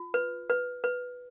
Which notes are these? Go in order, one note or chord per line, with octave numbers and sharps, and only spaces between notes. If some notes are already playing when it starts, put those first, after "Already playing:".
Already playing: F4
B4
B4
B4